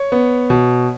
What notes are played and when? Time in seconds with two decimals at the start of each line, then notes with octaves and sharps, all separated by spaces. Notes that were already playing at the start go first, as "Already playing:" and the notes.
Already playing: C#5
0.12 B3
0.50 B2